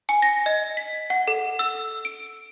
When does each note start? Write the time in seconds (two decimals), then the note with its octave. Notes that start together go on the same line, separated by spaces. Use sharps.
0.09 G#5
0.22 A#6
0.46 D#5
0.77 B6
1.10 F#5
1.28 A4
1.59 E6
2.05 D7